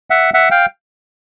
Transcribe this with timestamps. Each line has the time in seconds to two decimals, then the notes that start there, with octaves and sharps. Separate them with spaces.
0.10 E5 F#5
0.34 E5 F#5
0.51 F5 G5